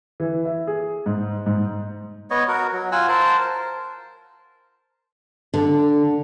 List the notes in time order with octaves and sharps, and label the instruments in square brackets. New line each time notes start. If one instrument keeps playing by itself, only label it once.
[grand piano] E3
E5
G#4
G#2
G#2
[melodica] B3 C#5 D#5
F#4 A#4
F#3
F4 F#5 G#5 E6
A#4 C5 A5
[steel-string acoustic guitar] D3